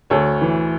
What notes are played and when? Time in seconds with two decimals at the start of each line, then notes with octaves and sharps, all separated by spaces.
0.10 D2 A4 C#5
0.41 E3